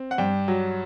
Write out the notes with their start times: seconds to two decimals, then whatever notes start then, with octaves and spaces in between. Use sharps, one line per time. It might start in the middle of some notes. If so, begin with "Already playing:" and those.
Already playing: C4
0.11 F#5
0.18 G2 G5
0.48 F#3